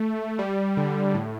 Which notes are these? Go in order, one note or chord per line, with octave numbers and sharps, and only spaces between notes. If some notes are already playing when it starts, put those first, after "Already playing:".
Already playing: A3
G3
D3
A2